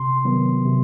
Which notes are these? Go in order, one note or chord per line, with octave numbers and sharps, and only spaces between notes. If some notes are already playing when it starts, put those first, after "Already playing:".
Already playing: C3 C6
D#3 F#3 B3
C3